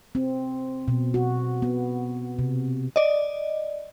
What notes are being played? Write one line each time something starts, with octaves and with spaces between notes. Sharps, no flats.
C4
B2
F#4
B3
C3
D5 D#5